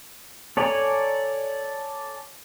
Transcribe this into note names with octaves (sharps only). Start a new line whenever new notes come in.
A4 C#5 D5 G#5 A#5